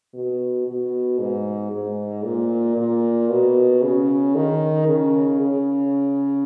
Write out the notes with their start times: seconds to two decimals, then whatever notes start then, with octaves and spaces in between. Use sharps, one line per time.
0.14 B2
0.68 B2
1.19 G#2
1.72 G#2
2.25 A#2
2.77 A#2
3.30 B2
3.82 C#3
4.35 D#3
4.88 C#3
5.40 C#3